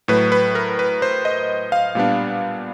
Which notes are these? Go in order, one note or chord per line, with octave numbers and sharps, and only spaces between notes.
A2 F#3 A3 B4
B4
A#4
B4
C5
D#5
F5
A#2 G3 B3 D4